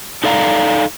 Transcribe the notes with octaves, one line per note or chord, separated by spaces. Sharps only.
D#4 A4 D5 F5 A5 A#5